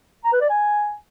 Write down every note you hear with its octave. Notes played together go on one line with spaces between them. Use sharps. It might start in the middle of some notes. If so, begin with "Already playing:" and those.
A#5
B4
D5
G#5